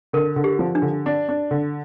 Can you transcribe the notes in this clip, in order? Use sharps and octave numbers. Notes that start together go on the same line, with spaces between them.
D3 A#4
D3
G4
F3
D4
D3
D4
D4
D3